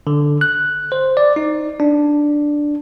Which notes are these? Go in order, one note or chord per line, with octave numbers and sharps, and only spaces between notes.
D3
F#6
C5
D5
D#4
D4